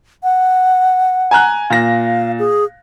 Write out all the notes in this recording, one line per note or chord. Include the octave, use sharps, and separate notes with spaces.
F#5
G#5 A#5 F#6
A#2 F5 A#6
G#4